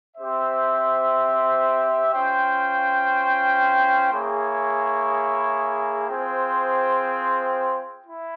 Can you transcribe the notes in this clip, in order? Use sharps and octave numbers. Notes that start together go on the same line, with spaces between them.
C4 G4 C5 E5
C#4 F4 C5 G5
A#3 E4 G#4 C#5
C4 F4 G#4 C5 G5
E4